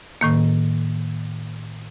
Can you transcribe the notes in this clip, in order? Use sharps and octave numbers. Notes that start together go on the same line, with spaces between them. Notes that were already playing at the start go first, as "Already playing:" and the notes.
A2 D#3 A#3